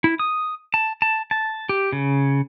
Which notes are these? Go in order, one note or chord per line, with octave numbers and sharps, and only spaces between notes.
E4
D#6
A5
A5
A5
G4
C#3